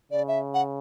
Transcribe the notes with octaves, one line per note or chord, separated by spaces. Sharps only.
C#3 D5
E5
F#5